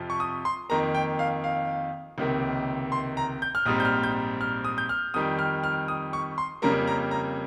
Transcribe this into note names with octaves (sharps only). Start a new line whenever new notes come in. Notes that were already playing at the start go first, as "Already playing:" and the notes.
Already playing: F2 C3 F3
C#6
D#6
C6
F2 D#3 A#3 A#5
G5
F5
F5
C#2 C3 D#3 A#3
C6
A#5
G6
F6
A#1 G#2 G3 C4 D#6
G6
F6
G6
F6
D#6
G6
F6
F2 D#3 G3 D#6
F6
F6
D#6
C#6
C6
F2 C#3 G3 A#3 A#5
A#5
A#5